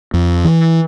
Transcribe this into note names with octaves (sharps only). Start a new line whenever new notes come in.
F2
E3